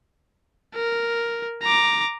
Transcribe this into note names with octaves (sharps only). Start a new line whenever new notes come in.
A#4
A#5 D6